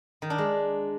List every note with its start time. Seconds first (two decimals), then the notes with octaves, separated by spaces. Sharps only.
0.22 D#3
0.30 D4
0.38 G#3